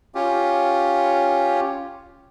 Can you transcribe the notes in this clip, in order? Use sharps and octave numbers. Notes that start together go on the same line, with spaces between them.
C#4 F4 G4